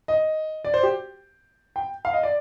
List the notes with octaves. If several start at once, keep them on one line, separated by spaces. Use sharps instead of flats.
D#5
D5
C5
G4
G5
F5
D#5
D5